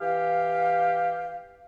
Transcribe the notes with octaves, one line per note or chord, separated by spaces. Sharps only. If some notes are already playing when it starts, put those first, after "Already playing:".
E3 G4 F5